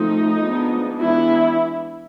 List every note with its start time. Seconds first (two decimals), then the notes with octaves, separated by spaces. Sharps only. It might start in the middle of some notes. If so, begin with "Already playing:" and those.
Already playing: F3 A3 C4 D#4
0.39 F3 G#3 B3 D4
0.99 E3 G#3 B3 D4 E4